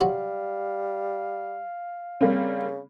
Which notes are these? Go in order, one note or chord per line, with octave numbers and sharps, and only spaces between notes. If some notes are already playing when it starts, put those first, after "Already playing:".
C3 F#3 G3 F#4 F5
C#3 G3 A#3 C4